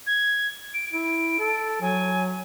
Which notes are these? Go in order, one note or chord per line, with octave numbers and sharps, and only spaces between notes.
G#6
D7
E4 D7
A4
F#3 G#5